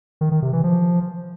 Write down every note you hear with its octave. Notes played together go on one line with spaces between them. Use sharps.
D#3
D#3
C3
E3
F3